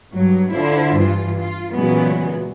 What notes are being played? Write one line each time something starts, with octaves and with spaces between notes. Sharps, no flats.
G2 F#3
D3 E4 F4 C5
G2 E3 F4
F4
A#2 C#3 E3 F#3 G#3 B3